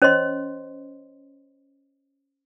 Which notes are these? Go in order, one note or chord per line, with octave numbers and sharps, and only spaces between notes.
C#4 C5 C#5 D#5 C6